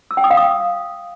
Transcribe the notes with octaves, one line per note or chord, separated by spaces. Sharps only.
E6
G5
D#6
F5
D#6